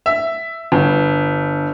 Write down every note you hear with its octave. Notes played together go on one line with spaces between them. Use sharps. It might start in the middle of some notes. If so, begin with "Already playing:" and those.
E5
G1